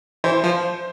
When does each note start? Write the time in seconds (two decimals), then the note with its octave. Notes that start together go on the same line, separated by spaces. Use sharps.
0.24 E3 C5
0.44 F3